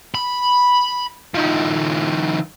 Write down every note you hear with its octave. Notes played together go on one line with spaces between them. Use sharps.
B5
D#3 F3